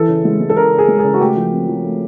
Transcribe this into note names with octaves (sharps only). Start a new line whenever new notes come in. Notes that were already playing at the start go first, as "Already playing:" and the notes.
Already playing: E3 A4
C#3
G#3
G#3
A4
C#3 A#4
C#4
G#4
G#3
G#4
C#3
F#4
A3 G4
F3
C4
F3
A3